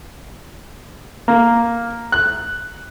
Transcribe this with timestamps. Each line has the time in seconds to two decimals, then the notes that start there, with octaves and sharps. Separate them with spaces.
1.28 A#3
2.12 F#6